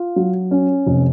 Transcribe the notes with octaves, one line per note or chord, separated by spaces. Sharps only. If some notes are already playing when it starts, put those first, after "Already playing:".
Already playing: F4
F#3
C#4
F1